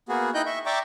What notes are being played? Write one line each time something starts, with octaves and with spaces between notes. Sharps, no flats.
A#3 B3 F#4 G#4
D#4 E4 D#5 G5 F#6 G6
E5 C#6
D5 E5 G5 A#5 C#6 D6